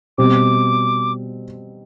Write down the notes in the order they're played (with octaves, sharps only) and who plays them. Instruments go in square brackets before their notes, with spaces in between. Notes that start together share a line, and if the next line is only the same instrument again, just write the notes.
[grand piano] B2 G3 C4 [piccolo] D6